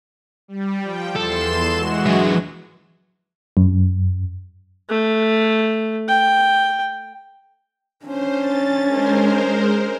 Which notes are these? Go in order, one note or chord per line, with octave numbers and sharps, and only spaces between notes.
G3
F3 G5
E2 A4 C6 E7
E3 G#3 F#4
F#3 E5
F#2
A3
G5
C#4 D4 C5
A6
G#3 A#4 C5